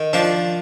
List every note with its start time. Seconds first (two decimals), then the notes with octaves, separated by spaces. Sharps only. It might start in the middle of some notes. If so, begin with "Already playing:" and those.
Already playing: D#3
0.13 F3 D4